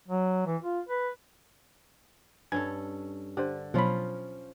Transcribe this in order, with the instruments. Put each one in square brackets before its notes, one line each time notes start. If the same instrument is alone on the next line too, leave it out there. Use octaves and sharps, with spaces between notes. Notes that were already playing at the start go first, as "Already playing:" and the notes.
[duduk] F#3
E3
F4
B4
[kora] G2 C#4 A4 [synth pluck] G#5 G#6
[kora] D3 [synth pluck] G4 C5
[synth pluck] B2 F#3 B5 [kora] F3 C#4 F4